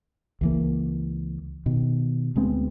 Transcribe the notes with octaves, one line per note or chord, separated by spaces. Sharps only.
C#2 E3 A#3
B2 D#3
D2 G#3 B3 C4